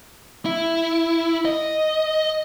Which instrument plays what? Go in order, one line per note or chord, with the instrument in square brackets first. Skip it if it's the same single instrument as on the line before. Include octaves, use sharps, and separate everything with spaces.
[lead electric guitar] E4
D#5